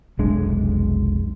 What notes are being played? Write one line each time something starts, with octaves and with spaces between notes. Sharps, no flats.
F1 B1 G#3 D4